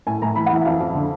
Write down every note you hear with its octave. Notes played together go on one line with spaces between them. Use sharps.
A2 G#5
A2 A#5
E3 B5
F#5
E3 E5
F2 F5
F2
D3